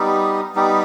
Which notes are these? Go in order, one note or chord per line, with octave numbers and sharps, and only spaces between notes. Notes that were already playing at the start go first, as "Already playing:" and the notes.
Already playing: G3 B3 D#4 G4
G3 B3 D#4 G4